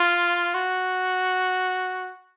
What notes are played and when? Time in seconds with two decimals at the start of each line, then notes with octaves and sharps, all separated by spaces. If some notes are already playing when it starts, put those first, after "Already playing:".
Already playing: F4
0.55 F#4